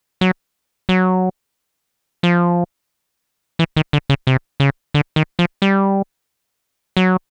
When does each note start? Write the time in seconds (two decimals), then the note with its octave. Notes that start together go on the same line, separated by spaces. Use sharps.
0.21 F#3
0.89 F#3
2.23 F3
3.59 E3
3.77 D#3
3.93 D3
4.09 C#3
4.27 C3
4.60 C#3
4.94 D3
5.16 D#3
5.39 F3
5.62 G3
6.97 F#3